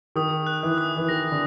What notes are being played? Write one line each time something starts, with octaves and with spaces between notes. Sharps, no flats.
D#3 D#6
F#6
E3
D#6
E3
D#3 A#6
D3